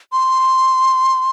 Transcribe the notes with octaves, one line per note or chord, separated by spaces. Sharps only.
C6